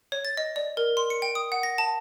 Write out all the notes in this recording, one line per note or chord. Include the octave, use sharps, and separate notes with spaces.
C#5
A6
D#5
D5
A#4
C6
C#7
G5
D#6
F#5
A#6
A5